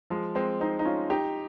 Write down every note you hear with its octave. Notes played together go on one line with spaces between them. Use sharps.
F3 G#3
G#3 C4
C4 D#4
D#4
C#4 F4
D#4 G4